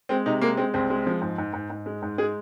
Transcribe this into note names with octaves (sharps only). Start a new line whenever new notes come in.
G#3 C4
C3 D#4
G#3 A#3
G#3 C4
C2 C4
G#3
F3
G#2
G#2
G#2
G#2
G#3
G#2
G#3 G#4